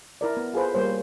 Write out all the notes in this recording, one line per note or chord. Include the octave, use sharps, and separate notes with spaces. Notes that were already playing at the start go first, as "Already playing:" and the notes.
E4 A#4 D5
B3
F4 G#4 A4 B4 C5
G3 A#3 C5 C#5